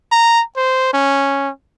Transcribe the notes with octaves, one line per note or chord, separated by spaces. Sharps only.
A#5
C5
C#4